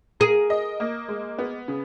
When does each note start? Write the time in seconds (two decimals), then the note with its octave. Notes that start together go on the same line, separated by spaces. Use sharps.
0.20 G#4 A#4
0.50 D#5
0.80 A#3
1.08 G#3
1.38 B3
1.68 C#3